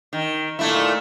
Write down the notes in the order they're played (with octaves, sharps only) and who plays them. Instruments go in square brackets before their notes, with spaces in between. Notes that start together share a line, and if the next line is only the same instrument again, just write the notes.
[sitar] D#3
A#2 A3 E4